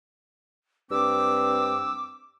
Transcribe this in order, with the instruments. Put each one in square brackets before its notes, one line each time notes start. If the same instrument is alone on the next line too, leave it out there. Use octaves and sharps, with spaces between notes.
[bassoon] G2 [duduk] C4 [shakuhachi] D6 [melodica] E6